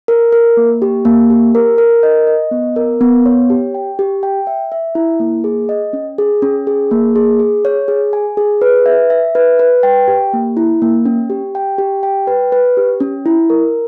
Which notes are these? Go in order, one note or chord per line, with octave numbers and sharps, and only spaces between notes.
A#4
A#4
A#3
G4
A#3
G4
A#4
A#4
D#5
D#5
B3
A#4
B3
C#5
G4
G5
G4
G5
E5
E5
E4
A#3
G#4
D#5
C#4
G#4
C#4
G#4
A#3
G#4
G#4
C#5
G#4
G#5
G#4
B4
E5
E5
B4
B4
G5
G4
A#3
E4
A#3
C#4
G4
G5
G4
G5
B4
B4
G4
C#4
E4
A#4